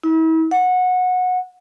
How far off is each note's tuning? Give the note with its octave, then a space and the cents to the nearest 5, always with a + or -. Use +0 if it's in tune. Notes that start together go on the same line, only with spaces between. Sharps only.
E4 -40
F#5 -20